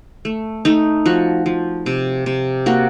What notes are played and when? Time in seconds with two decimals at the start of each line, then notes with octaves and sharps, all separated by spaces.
0.25 A3
0.65 A3 D#4
1.06 F3 F#4
1.46 F3
1.86 C3
2.26 C3
2.66 A#3 F#4